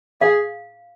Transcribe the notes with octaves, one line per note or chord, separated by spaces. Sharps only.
G#4 F5